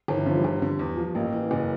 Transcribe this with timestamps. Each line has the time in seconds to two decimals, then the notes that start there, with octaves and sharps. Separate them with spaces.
0.08 G1 D#3
0.17 E3
0.26 D3 F3
0.35 G3
0.44 G1
0.62 D3
0.79 E2
0.97 F3
1.15 A1 A#3
1.32 E3
1.51 F#1